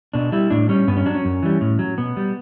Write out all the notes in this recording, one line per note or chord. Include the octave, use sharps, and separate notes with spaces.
B2 D4
G3 E4
A2 D4
G3 C#4
G2 B3
C#4
F#3 D4
C#4
F#2
E3 G3
A2
F#3
B2 B3
G3